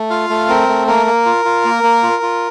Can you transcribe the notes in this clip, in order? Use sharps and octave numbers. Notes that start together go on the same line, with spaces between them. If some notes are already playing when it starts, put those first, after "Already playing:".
Already playing: A3
F4 F5
A3
C4 A#4
A3
A#3 A#4
A#3
F4
F4
A#3
A#3
F4
F4